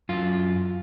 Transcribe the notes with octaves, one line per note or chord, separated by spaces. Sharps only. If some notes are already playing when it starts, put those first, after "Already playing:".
F#2 F4